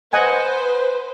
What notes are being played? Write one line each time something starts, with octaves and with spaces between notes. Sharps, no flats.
B4 C5 D#5 F#5 G#5